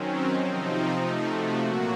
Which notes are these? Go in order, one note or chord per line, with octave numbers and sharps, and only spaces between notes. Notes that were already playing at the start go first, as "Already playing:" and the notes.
Already playing: D#3 F#3 C4 C#4
C3 F3 C4 D#4
C3 F3 A3 D#4
F#4
A#2 F#3 A#3